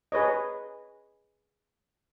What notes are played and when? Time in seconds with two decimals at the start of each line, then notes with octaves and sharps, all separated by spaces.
0.12 G#4 B4 C#5 D#5